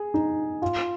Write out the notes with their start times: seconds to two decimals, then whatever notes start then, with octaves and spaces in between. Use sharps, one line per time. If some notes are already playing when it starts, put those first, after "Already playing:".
Already playing: G#4
0.14 D#4
0.62 F4